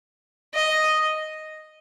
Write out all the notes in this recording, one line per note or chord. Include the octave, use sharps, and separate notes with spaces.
D#5